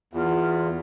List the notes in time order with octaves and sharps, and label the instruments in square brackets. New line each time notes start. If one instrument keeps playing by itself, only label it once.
[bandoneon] E2 [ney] F4